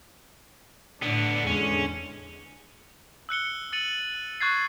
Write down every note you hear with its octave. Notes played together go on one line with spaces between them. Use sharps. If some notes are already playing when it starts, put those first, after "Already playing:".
A2 D3 B3 D4
E2 D3 G#3 C#4
E6 F#6 C#7 G7
E6 A6 C#7 D#7 F#7
C#6 F#6 G#6 A6 C7